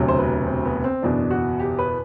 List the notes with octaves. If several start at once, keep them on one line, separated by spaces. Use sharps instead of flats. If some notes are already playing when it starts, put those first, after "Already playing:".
Already playing: E1 D2 C3 F#3
C5
B4
C4
B3
C4
F#1 E2 B2 D4
F#4
G4
B4